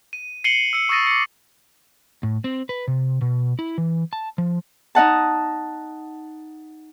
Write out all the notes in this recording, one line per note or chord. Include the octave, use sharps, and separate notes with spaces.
D#7
C7 C#7 D#7 F#7 G7
E6 C#7
C#6 D#6 E6 A6 A#6 D#7
D6 C#7
A2
C4
B4
C3
B2
E4
E3
A5
F3
D#4 D#5 F#5 A5